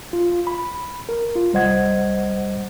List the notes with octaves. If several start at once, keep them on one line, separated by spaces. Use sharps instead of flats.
F4
B5
A#4
F4
C2 G3 C5 D#5 F#5 G#6